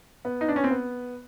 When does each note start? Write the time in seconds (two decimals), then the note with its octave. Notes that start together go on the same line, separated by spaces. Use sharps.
0.25 B3
0.41 D#4
0.48 D4
0.56 C#4
0.64 C4
0.71 B3